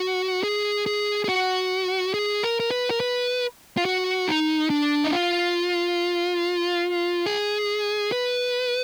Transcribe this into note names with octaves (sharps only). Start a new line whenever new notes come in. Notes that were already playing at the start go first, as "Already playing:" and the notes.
Already playing: F#4
G#4
G#4
G#4
F#4
G#4
A#4
A#4
B4
A#4
B4
F4
F#4
D#4
D4
D#4
F4
G#4
B4